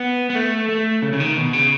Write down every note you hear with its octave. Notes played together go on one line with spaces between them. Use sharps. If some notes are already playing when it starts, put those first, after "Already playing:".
Already playing: B3
B3
A3
A3
C#3
C#3
D#3
B2
C#3